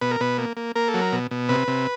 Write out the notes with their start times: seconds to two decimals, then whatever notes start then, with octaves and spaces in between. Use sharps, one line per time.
0.01 B2 B4
0.11 A#4
0.20 B2 B4
0.38 A#3
0.57 A#3
0.75 A#3 A#4
0.88 A4
0.94 F#3
1.01 A#4
1.12 B2
1.31 B2
1.49 C3 B4
1.68 C3